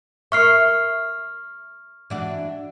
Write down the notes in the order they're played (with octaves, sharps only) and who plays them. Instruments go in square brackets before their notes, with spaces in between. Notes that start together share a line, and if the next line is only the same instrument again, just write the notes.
[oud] A#4 E5 [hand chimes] C#6 F6 C7
[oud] E3 D4 F#4